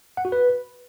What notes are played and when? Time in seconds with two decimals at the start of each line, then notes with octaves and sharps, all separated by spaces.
0.17 F#5
0.25 F#4
0.32 B4